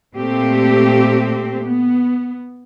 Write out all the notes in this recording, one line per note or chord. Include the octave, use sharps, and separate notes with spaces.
A#2 A3 C4 G4
B3